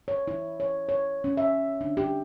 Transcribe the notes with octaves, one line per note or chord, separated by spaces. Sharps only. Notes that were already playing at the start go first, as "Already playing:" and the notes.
C#5
E4
C#5
C#5
C#4
E5
D4
G4